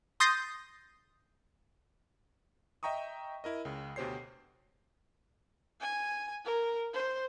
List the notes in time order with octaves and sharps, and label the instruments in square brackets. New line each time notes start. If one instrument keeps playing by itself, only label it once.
[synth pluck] C6 D#6 G6 A6 A#6 C7
[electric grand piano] D#5 E5 G5 A#5 C#6 D#6
E4 A#4 D#5
C#2 C#3
D2 B2 G4 C5 C#5 C7
[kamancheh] G#5
A#4
C5